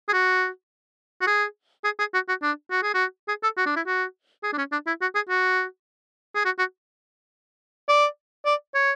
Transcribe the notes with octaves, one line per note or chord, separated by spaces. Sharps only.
G#4
F#4
F#4
G#4
G#4
G#4
F#4
F#4
D4
F#4
G#4
F#4
G#4
A4
F#4
D4
E4
F#4
G#4
D4
C#4
D4
E4
F#4
G#4
F#4
G#4
F#4
F#4
D5
D5
C#5